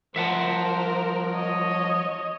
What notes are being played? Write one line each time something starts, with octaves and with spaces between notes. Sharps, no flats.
F3 F#3 A#4 C5 E5 F#5 A5
C#5 D#5